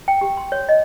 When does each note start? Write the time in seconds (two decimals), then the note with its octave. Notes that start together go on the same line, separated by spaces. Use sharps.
0.08 G5
0.21 G4
0.37 C6
0.52 C#5
0.69 D#5